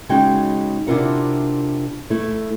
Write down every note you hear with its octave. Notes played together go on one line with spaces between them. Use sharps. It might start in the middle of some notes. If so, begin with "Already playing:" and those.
C#3 G#3 D#4 F#4 G5
C3 D4 E4 F4 A#4 F#5
A3 E4